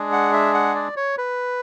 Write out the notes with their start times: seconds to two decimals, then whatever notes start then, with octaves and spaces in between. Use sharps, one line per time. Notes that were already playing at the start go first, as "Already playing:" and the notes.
Already playing: G#3 D4 G#4
0.12 F#5
0.33 E5
0.54 F#5
0.75 D5
0.96 C#5
1.18 B4